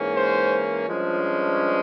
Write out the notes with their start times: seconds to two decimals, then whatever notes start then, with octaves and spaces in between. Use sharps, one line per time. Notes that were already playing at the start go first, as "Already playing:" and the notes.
Already playing: G#2 E3 A#3 C#4
0.14 C5
0.88 G2 F3 G#3 C#4